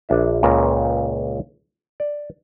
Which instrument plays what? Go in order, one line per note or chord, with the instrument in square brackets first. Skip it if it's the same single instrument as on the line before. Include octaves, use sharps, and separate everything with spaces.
[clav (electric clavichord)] A#1 D4 E5
C#2 A#2 C#3 A#4
D5